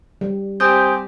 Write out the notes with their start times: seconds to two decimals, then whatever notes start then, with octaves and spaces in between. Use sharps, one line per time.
0.21 G3
0.60 C4 G4 G#5 D#6 G6